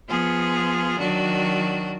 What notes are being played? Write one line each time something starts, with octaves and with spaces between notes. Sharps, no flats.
F3 B3 F4 G#4
D#3 F#3 D4 F#4